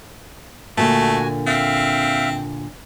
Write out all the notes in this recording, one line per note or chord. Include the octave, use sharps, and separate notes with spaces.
A#2 D3 A3 F#4 G#5
C4 E5 F5